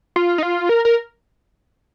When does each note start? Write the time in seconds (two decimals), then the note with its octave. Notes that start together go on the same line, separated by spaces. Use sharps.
0.16 F4
0.38 D#4
0.43 F4
0.69 A#4
0.85 A#4